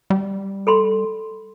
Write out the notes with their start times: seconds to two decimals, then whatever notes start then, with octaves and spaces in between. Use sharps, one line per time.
0.10 G3
0.67 A4 B5 C6